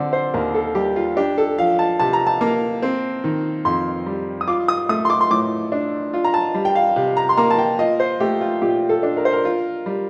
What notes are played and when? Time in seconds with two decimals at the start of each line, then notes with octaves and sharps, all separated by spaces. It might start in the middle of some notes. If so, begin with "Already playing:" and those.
Already playing: D3 C4 D5
0.13 C5
0.34 D#2 A#4
0.54 A4
0.75 G3 G4
0.96 F4
1.17 D4 G4
1.38 A4
1.58 F3 F5
1.79 A5
2.00 C3 A5
2.13 A#5
2.27 A5
2.41 A#3
2.82 C4
3.24 D#3
3.65 F2 C6
4.06 G3
4.41 D#6
4.48 F4 D6
4.68 D#6
4.89 A3 D#6
5.05 C6
5.10 D6
5.21 C6
5.31 A2 D6
5.72 D4
6.13 F4
6.24 A#5
6.34 A5
6.54 G3
6.65 G5
6.75 F5
6.96 C3
7.17 A#5
7.29 C6
7.37 A#3 A#5
7.51 A5
7.58 G5
7.79 F4 D#5
8.00 C5
8.20 A3 G4
8.41 F4
8.62 A#2 G4
8.89 A4
9.03 D4
9.17 A#4
9.25 C5
9.33 A#4
9.45 F4
9.86 G3